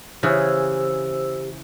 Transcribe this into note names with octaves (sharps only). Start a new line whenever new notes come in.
C#3 E3 G4 G#4 C5 E6